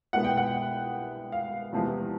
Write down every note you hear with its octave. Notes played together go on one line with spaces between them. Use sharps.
C2 B2 G#3 B3 F#5
G5
F#5
F5
E2 C3 F3 G#3 B3